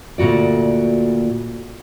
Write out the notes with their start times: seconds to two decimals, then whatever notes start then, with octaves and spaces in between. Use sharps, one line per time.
0.18 D2 A#2 C#3 F#4 D5